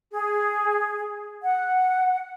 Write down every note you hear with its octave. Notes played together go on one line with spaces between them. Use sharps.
G#4
F#5